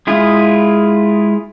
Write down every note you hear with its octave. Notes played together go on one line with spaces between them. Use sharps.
G#3 E4 F4 G#4